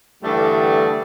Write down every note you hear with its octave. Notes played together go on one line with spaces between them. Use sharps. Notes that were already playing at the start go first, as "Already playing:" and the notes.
G2 D3 E3 G3 A3